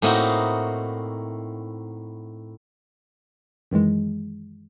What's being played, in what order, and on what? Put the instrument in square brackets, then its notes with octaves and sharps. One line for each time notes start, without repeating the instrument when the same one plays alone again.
[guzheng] A2 A#3 C4 D#4 E4 F#4
[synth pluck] F#2 D#3 E3 G#3